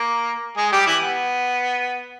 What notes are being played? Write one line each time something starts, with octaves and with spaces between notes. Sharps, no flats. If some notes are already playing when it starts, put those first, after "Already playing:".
Already playing: A#3 A#4
G#3 G#4
G3 G4
E3 E4
B3